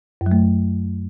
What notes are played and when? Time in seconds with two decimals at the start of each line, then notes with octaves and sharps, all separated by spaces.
0.21 F#2
0.26 F#3
0.32 A3